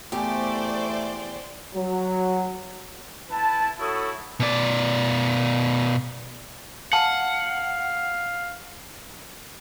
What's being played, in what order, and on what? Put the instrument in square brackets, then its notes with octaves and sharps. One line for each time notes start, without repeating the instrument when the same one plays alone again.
[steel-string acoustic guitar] E2 G4 [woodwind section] A3 [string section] C5 D5 [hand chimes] G5 G#5
[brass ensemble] F#3
[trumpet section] E4 B4 A5
E4 F#4 A4 C#5 D#6
[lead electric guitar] B2 D5
[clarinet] F5 [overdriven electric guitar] F#5 [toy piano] A5